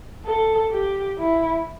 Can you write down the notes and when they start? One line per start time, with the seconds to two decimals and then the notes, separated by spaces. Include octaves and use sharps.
0.26 A4
0.72 G4
1.18 E4